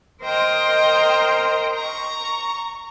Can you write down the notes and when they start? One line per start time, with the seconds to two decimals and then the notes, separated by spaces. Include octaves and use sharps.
0.23 A#4 C5 D#5 G5 A#5 C6
1.77 A#5 C#6